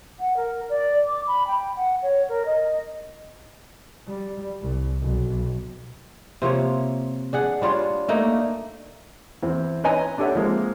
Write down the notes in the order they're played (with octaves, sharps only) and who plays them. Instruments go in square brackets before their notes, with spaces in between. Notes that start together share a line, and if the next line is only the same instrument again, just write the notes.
[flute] F#5
A#4
D5
D6
B5
G5
F#5
C#5
A#4
D#5
[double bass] G3
C2
B1
[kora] C3 F3 A#3 C#5
D4 G#4 F#5
G3 D4 F4 C#5
A3 A#3 D4 D#4
[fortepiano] E2 C4
B4 C#5 D#5 G#5 A#5
D4 G4 A4 C#5 E5 F#5
F3 G#3 A#3 C4